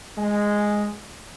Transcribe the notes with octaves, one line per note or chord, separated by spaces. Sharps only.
G#3